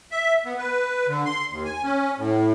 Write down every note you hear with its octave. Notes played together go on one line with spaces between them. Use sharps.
E5
B3
B4
D3
C6
D#2
G#5
C#4
A2